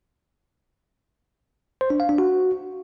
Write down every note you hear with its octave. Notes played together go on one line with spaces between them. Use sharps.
C5
D4
F5
D4
F#4